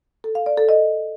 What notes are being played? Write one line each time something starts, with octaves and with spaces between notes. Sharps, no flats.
A4
F5
D5
A4
D#5